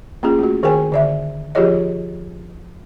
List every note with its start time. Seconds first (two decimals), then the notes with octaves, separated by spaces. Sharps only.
0.23 A#3 C#4 F4 G#4
0.39 A3 F#4
0.63 D#3 G#4 A#4 C5 G5 G#5
0.92 D3 D5 E5
1.55 F3 F4 G4 G#4 C#5 D#5